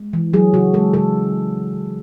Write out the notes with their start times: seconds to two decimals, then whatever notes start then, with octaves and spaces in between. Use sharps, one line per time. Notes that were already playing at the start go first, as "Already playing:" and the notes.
Already playing: G#3
0.13 E3
0.33 F#3 G#4
0.54 C#3 F#4
0.74 G#3 A4
0.94 C#3 A4